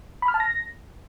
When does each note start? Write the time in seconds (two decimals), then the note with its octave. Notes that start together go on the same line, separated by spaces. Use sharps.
0.22 B5
0.28 F6
0.34 A5
0.40 A#6